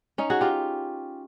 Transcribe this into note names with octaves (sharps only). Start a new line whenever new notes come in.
C#4 D#4
F#4 G#4
F4 G4